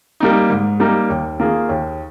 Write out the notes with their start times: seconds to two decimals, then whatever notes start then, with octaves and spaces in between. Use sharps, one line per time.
0.20 G3 A#3 D#4
0.50 G#2
0.80 G3 A#3 D#4
1.10 D#2
1.39 D#3 A#3 F4 G#4
1.69 D#2